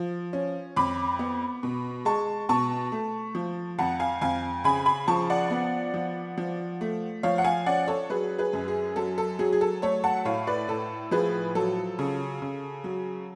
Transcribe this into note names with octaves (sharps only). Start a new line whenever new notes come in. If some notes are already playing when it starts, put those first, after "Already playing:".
Already playing: F3
C#4
F2 B5 D6
B3
B2
G#3 A5 C#6
B2 A5 C#6
A3
F3
F2 F#5 A5
F5 G#5
F2 F5 G#5
C#3 G#5 B5
G#5 B5
F3 A5 C#6
D5 F#5
B3
F3
F3
A3
F3 C#5 F5
F#5
F5 G#5
C#4 D5 F#5
A4 C#5
F#3 G#4 B4
G#4 B4
F#2
G#4
F#3 A4
A4
F#3 G#4
G#4
A4
A3 A4 C#5
F#5 A5
A2 C#5 F5
B4 D5
A2 A4
F3 G#4 B4
F#3 A4
C#3
C#3
F#3